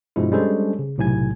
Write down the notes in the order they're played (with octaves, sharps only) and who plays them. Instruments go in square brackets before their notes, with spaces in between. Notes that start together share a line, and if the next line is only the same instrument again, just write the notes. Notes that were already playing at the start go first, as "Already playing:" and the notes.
[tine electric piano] G2 B2 F3 G3 G#3 E4
G3 G#3 C#4 D4 A4 C5
C#3
B1 A2 C3 G#5 G#6